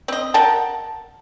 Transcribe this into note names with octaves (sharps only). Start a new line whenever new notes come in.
C4 D#5
A#4 F#5 G5 A5